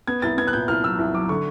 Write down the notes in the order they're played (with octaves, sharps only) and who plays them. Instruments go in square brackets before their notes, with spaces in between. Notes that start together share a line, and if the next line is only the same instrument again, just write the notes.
[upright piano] B3 [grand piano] G#6
[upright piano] C2 [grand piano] A6
[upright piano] B3 [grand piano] G#6
[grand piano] F#6
[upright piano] A#2 [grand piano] G6
[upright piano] C2 [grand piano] F6
[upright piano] F#3 [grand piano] E6
[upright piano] C2
[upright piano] F#3 [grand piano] D6
[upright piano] D3 [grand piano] C#6